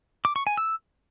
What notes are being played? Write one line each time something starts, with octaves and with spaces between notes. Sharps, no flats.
D6
C#6
G#5
E6